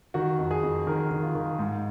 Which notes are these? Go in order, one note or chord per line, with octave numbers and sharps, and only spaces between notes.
D#3 F#4
F2
G#4
F2
D#3 A#4
D#3
F4
D#3
G#2